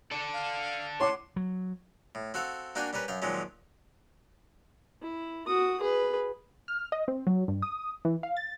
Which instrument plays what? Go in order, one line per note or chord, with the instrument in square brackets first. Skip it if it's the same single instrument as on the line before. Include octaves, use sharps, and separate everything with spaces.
[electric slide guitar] A4 D5
[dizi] F5
[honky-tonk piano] C#5 F#5 D6 [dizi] C6
[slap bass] F#3
[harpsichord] A2
C4 F#4 A4 F5
A#3 D4 F#4 F5 G5 G#5
G3 C#4 A#4 B4
F#2 F5 G5
A#2 D#3 F3 F#3 G#3 C#4
[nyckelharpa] E4
F#4 D#6
G#4 B4
[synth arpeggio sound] F6
D#5
C4
F#3
G2
D#6
E3
F5
A6